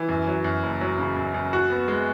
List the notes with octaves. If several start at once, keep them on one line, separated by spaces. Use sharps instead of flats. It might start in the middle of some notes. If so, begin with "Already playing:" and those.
Already playing: E3
F#2
F#3
F#2
F#1
F#3
C#3
F#2
F#2
F#4
B3
G#3